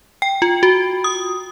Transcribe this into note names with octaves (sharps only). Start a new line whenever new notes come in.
G5
F4
F#4
D#6